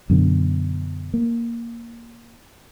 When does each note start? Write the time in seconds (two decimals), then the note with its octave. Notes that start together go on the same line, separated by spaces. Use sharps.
0.10 F#2 B2 D3
1.14 A#3